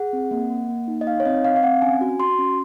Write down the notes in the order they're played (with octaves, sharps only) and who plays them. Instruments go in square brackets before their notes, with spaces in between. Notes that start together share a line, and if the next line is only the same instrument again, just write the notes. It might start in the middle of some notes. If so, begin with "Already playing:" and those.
Already playing: [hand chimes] G#4 F#5
C4
A#3
A#3
A#3
D#4
D#5
D#4 F5
C#5
C4 D#5
C4 F5
F5
C4 F#5
C#4 G#5
F#4
F#4 C6
C#4